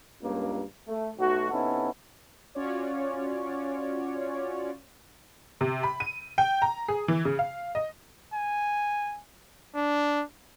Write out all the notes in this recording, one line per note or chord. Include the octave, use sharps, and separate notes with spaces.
C#2 G2 A#3
A3
B1 A3 F#4
C3 B3 C#4 D#4 E4 A4
C#4 F4 F#4 C#5 D5
C3
B5
D#7
G5
A#5
G#4
E3
C#3
F5
D#5
G#5
D4